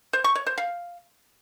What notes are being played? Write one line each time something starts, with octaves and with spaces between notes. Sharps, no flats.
C5
C#6
C#5
C5
F5